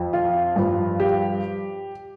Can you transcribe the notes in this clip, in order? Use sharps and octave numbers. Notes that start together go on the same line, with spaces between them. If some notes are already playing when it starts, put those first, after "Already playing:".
Already playing: F2 F3
F4
G2 F3
G4